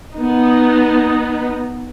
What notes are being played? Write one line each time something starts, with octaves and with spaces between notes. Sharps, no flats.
B3 D#4